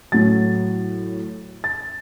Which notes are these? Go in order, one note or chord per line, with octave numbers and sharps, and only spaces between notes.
A2 F#3 A6
A6